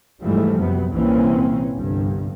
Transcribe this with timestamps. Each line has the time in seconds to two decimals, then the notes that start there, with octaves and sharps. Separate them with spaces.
0.23 G#2 E3 F3 G3 A3
0.57 F#2 C3 B3
0.92 C2 A#2 E3 A#3 C4 C#4
1.75 G1 C2 G2